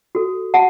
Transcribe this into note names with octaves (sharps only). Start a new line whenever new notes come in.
F#4 A4
F#4 F#5 A5